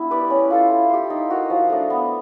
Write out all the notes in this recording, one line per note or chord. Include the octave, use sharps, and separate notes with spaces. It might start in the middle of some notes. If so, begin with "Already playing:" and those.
Already playing: B3 D4 E4 E5
G4 B4 D5
C#4
F4 A4 C5
E4
G4 C5
D#4
F#4 A#4 D#5
F3
A3 D4
B3